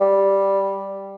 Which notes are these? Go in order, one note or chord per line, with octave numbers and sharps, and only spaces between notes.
G3